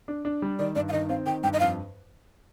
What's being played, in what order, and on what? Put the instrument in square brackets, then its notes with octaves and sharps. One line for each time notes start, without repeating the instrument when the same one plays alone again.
[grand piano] D4
D4
G3
[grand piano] D#3 [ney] D5
[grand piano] G2 [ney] D5
[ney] F5
[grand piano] D#3 [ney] D#5
[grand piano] C4 [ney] F5
[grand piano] D#3 [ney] G5
[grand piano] G2 [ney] G5
[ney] D#5
[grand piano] F2 [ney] F5